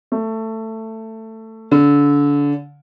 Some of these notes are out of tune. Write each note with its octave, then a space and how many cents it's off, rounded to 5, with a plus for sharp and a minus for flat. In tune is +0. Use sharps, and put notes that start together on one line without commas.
A3 +15
D3 -30